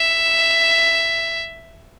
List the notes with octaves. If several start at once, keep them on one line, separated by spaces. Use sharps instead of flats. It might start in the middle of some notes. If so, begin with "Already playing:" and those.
Already playing: E5